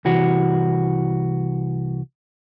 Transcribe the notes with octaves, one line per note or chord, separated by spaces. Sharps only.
C2 E3 F#4